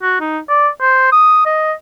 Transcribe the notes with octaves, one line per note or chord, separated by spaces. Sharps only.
F#4
D#4
D5
C5
D#6
D#5